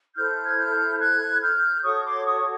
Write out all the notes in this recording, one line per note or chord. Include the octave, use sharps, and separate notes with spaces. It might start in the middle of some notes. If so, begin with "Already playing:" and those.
E4 A4 C5 F6 G6
G#6
F6 G6
F#6 G#6
F6 G6
F#4 A4 C#5 C#6 D#6
C6 D6
C#6 D#6